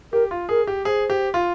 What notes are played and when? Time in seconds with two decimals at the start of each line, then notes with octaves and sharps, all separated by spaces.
0.12 G4 A#4
0.31 F4
0.49 G#4 A#4
0.67 G4
0.85 G#4 C5
1.10 G4
1.34 F4